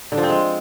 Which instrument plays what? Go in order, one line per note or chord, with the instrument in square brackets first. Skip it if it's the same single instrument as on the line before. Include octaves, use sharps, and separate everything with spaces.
[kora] D3
F3
C4
G#3